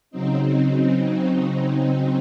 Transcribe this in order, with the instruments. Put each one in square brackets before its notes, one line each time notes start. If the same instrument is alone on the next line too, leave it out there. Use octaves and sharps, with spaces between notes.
[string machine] C#3 F#3 C4 D#4